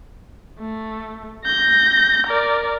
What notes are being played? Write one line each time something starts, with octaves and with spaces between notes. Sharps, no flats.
A3
G6 A#6
A#4 D5